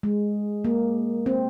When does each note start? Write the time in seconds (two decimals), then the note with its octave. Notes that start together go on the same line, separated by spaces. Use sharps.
0.03 G#3
0.65 A#3
1.26 C4